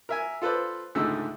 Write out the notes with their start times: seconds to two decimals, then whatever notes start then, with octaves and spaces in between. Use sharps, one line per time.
0.09 A#4 E5 G#5
0.42 F4 A4 B4 C5 D5
0.95 C#2 G#2 D3 A3 E6